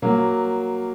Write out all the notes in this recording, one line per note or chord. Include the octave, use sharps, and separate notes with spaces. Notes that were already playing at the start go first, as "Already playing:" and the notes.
F#3 A#3